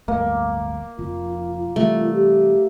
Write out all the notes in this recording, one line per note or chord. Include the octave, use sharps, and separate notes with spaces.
D1 G1 A3 A#3
F1 F4
C3 E3 G3 A3
G4